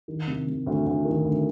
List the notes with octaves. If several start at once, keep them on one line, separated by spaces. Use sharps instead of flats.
D#3
C3
C3
D2
D2
D#3
D2